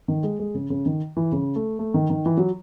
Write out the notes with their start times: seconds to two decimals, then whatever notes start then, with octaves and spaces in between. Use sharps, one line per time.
0.08 D#3
0.23 G#3
0.40 G#3
0.55 C#3
0.70 C#3
0.86 D#3
1.17 E3
1.32 C#3
1.56 A3
1.79 A3
1.94 D#3
2.10 D#3
2.26 E3
2.37 F#3